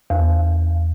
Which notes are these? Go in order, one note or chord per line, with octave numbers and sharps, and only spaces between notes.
E2